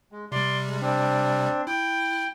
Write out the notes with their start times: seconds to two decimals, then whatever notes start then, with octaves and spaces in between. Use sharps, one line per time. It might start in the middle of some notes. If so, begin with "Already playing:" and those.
0.12 G#3
0.32 C3 G3 D5 C6
0.67 G#3
0.81 C4 D4
1.67 E4 G5